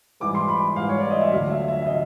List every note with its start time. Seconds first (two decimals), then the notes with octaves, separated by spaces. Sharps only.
0.20 G#2 E3 G3 D6
0.35 C6
0.48 B5
0.76 G#2 E3 G3 F5
0.89 C#5
1.00 D5
1.10 D#5
1.21 E5
1.31 D2 D3 F#3 F5
1.50 E5
1.68 E5
1.82 E5
1.86 D3 D#5